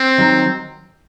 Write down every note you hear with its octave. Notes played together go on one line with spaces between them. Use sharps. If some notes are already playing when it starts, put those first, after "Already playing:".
Already playing: C4
D#3 F#3